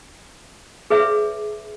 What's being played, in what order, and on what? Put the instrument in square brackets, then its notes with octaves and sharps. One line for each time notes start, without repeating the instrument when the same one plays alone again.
[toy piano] G#4 B4 C#5 E5